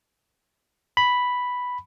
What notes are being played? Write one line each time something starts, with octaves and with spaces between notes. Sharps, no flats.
B5